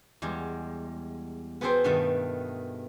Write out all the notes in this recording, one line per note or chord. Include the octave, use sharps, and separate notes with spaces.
E2 G3 G#3
B3 F#4 G#4 A4 C5 G5
G2 B2 D#3 A3 F#5 A5